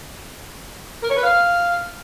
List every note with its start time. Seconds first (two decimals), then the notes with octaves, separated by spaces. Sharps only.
1.03 A#4
1.10 C#5
1.17 B4
1.24 F5